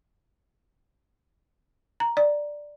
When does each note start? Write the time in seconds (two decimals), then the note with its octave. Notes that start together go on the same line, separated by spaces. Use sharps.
2.00 A#5
2.17 D5